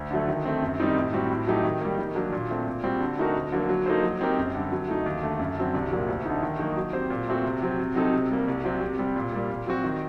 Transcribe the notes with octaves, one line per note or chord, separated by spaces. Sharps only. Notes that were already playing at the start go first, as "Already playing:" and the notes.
Already playing: D2
D3 F#3 A3
D#3
A3 C4
F#2
D#3 G3 C4 D#4
A2
G3 C4 F#4
A2
F#3 A3 D#4 G4
D#3
G3 A#3
D#3
F#3 A#3 D4
A#2
A3 C4
A#2
G3 C4 F#4
D3
A3 D#4 F#4 A#4
D2
D3 F#3 A#3
F#3
A#3 D#4 A4 C5
F#3
C4 D#4 G4 A#4
F#2
D3 G3
F#3
A3 D#4
D#2
D3 A3
F#2
D3 F#3 C4
C2
A#2 F#3 A#3
D2
D3 A3 D#4
D#3
F#3 A#3 D#4 F#4
F#3
C4 G4 C5
A#2
A3 C4 F#4 A4
C3
F#3 C4
C3
F#3 C4 D#4 A4
C3
G3 A#3
C2
C3 F#3 C4
C3
G3 C4
A#2
G3 A#3
A#2
F#3 C4 F#4
D#3